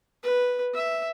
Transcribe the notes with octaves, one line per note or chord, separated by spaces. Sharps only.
B4
E5